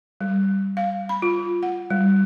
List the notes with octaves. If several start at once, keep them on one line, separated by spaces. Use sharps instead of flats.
G3
F5
B5
F4
F#5
G3